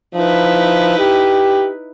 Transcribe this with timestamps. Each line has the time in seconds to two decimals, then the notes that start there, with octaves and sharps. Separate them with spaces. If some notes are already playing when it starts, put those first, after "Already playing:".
0.15 F3 D#4 E4 B4
0.99 G4